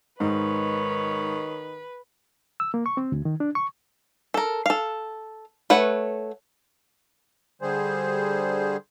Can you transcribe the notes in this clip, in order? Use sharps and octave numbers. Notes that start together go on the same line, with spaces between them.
G#2 D#3 B4 C#5
E6
A#3
C#6
C4
D2
D#3
D4
C#6
A4 A#4
A4 F5
A3 B4 C#5 F#5
D3 G3 G#4 C5